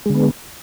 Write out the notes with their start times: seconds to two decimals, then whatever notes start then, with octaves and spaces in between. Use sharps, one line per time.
0.06 G#3
0.10 D3
0.14 B3